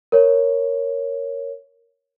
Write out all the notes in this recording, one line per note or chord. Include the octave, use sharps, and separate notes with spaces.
A#4 C#5